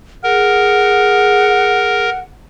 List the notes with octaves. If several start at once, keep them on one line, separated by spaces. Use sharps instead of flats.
G#4 A#4 F#5